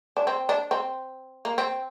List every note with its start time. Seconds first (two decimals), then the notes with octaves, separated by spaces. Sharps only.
0.17 D4
0.27 C4
0.49 D4
0.71 C4
1.45 A#3
1.58 C4